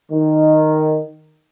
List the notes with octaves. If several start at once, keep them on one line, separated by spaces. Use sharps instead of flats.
D#3